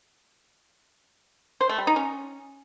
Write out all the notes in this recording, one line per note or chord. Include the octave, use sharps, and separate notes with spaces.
C5
A3
G3
D#4
C#4